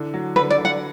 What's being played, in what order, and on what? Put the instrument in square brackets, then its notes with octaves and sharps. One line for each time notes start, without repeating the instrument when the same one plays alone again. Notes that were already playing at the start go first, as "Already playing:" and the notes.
Already playing: [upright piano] D3 E3
F#3
[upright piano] D3 [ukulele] B4
[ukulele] D5
[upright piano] D3
[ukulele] F#5